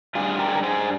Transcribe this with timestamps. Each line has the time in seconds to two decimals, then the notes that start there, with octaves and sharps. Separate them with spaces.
0.15 G2 G3 F4 G#4
0.39 G4 A#4
0.48 G#4
0.55 A#4
0.63 G#4 C5